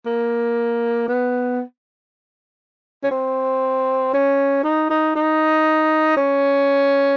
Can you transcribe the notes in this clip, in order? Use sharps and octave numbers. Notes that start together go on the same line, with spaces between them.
A#3
B3
C#4
C4
C#4
D#4
D#4
D#4
C#4